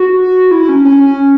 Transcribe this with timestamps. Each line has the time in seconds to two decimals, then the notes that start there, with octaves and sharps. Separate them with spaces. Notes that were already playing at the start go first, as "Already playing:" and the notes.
Already playing: F#4
0.51 E4
0.69 C#4
0.85 C#4